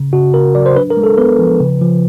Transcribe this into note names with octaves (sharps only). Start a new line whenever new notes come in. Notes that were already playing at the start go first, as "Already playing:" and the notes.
Already playing: C#3
C#3 F#4
C#3 A#4
F#3 D5
C5
D4 B4
A#4
G#3
A4
B3 B4
F3
C#3
F3